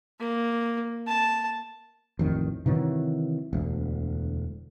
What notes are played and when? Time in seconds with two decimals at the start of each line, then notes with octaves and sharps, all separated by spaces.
0.20 A#3
1.07 A5
2.19 A1 F2 D#3
2.66 C3 D#3 E3 F#3
3.53 E1 D2